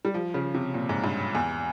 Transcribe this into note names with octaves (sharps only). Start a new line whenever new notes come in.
G3
F3
C#3
C3
A#2
G#2
G2
E2